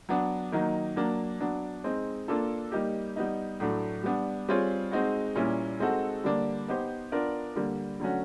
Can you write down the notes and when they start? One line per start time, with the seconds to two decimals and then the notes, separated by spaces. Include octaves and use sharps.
0.09 F#3 B3 D4
0.52 D#3 F#3 A#3 D#4
0.96 F#3 A#3 D4
1.40 F#3 B3 D4
1.84 G#3 C4 D#4
2.28 A#3 D4 F4 A4
2.72 G3 A#3 D#4 G4
3.16 G3 B3 D#4
3.60 A2 F#3 A3 D4 F#4
4.04 G3 B3 D4
4.48 G3 C4 F4 G#4 C#5
4.92 G#3 C4 D#4 F#4
5.35 A#2 G3 A#3 C#4 E4
5.80 G#3 C4 D#4 F#4 A4
6.24 D3 G3 A#3 D4
6.68 B3 D#4 G4 C5
7.12 B3 D4 F4 A#4 D5
7.56 D3 G3 A#3
8.00 D3 F#3 A3 C#4 F#4